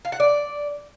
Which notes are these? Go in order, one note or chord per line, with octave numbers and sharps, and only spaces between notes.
F5
F#5
D5